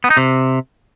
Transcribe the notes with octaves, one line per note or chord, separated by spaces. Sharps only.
B3
D#4
C3